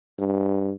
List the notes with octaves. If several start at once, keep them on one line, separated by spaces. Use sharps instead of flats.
G2